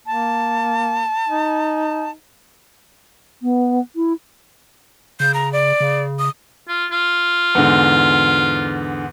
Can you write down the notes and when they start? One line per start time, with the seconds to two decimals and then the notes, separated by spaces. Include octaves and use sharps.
0.06 A#3 A5
1.27 D#4
3.42 B3
3.96 E4
5.20 C#3 G6
5.34 A#5
5.53 D5
5.80 C#3
6.19 D#6
6.68 F4
6.91 F4
7.55 E2 G#2 D3